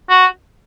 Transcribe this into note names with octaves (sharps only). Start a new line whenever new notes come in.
F#4